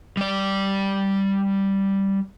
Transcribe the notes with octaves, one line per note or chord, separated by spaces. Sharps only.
G3 D5